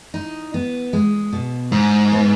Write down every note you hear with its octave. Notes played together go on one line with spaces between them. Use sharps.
D#4
B3
G#3
B2
G#2 D#4
B3